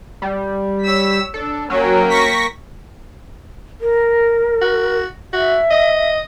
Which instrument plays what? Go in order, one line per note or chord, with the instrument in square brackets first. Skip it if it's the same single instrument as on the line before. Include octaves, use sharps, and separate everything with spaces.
[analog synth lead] G3
[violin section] C#5 E6 B6
[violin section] D4 [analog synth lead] A4
[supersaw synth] F#3 [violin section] A#3 C#5 G5 [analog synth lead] C#4
[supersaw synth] C#6 A#6 B6
[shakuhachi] A#4
[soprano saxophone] F#4
[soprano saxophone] F#4 [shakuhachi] E5
[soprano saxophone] D#5